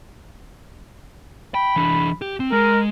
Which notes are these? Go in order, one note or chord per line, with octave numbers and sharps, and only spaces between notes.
G5 B5
E3 D4
G4
C4
G#3 A#4